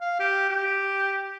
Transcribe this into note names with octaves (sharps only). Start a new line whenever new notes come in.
F5
G4
G4